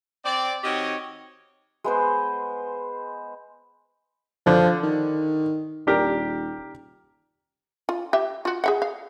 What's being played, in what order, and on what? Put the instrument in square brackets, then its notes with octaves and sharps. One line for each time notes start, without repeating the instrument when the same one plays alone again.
[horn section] C4 D5
D#3 C4 F#4 G4 C#5 D#5
[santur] G#3 B3 C5
[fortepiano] D3 [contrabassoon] F3
[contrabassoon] D#3
[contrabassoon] D#1 [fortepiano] D4 G4 A#4
[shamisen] F4
G4 E5
F4 F#4
G#4 E5 F#5
F5